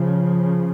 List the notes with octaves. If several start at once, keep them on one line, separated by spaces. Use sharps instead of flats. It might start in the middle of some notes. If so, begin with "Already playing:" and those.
Already playing: C#3 F3